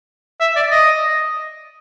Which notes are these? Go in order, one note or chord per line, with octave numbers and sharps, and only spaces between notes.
E5
D5
D#5